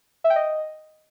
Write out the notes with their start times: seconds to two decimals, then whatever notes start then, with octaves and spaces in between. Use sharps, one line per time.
0.24 E5
0.30 G5
0.36 D#5